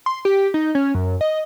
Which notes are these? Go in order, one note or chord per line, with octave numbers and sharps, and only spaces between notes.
C6
G4
D#4
C#4
F#2
D#5